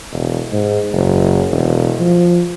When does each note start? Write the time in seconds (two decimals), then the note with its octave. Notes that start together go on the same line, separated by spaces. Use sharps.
0.13 E1
0.52 G#2
0.92 F#1
1.51 E1
2.00 F3